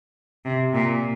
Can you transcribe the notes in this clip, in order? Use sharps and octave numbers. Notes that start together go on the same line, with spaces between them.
C3
A#2